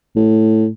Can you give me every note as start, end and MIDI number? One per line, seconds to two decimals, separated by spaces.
0.16 0.68 45